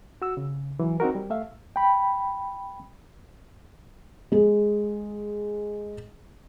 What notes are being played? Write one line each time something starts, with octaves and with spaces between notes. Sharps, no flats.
F#4 E6
C#3
E3 F#3
C4 D#4 F#4 A#4
G3
A3 E5 F5
G5 B5
G#3 G#4